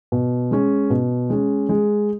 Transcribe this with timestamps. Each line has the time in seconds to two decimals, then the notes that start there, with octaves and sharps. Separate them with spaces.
0.12 B2
0.51 G#3 C#4
0.90 B2
1.30 G#3 C#4
1.69 G#3